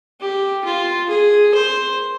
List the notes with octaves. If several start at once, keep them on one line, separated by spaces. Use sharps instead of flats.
G4
F4
G#4
C5